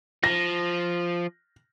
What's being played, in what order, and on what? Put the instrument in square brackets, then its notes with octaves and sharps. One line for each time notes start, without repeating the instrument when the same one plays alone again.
[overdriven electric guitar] F3 [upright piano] A#6